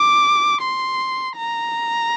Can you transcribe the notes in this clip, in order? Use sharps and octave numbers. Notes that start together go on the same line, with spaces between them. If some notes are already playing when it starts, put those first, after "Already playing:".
Already playing: D6
C6
A#5